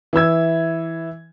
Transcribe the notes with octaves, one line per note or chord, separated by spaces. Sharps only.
E3 E4 E6 G#6